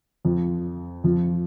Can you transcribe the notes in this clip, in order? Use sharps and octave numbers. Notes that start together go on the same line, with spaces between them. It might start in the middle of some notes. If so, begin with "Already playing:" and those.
F2 F3
F2 F3